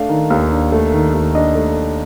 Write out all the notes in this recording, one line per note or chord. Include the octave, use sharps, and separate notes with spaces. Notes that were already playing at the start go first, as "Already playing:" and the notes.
Already playing: A3 D4 F5
D#3
D#2
D4
A3
D#3
D#2
D4 D#5
A3